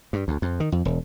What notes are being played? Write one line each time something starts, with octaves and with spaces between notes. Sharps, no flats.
G2
D2
F2
D#3
F2
E1